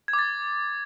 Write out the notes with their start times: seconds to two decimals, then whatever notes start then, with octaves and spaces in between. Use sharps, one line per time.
0.08 G#6
0.13 D6
0.19 A6